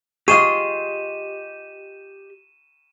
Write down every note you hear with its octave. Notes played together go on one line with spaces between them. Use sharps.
F4 G4 G#4 D#5 C#6 D#7 E7